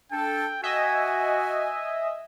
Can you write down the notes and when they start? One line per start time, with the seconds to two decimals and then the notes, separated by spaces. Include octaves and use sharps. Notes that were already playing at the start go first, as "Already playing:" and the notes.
0.12 D4 A4 G5
0.63 F#4 D#5 E5 G#5